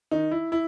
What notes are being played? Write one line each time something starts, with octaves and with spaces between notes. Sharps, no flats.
D#3 D#4
E4
E4